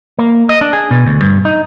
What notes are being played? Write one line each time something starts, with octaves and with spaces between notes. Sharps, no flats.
A#3
D#5
D4
G#4
B2
D2
G2
D#4